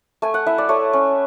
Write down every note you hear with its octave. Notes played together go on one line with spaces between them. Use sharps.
A3 G#5
F#5
E4 E5
D5
A3 C#5
C#4